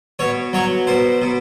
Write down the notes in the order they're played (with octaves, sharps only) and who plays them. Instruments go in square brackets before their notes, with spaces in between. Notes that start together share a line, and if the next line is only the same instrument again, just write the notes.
[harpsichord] B2 C#5
F#3 C#5
B2 C5
B2